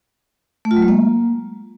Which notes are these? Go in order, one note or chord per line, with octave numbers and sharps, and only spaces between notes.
A3
F4
F#3
G#3
A#3